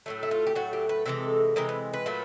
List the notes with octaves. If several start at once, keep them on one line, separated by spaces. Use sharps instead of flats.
A2 F#3 A3
E4
F4
G4
A2 F#3 A3 F#4
G4
B4
C3 E3 G#3 A4
C3 E3 G#3 A#4
B4
B4
A#2 F#3 A3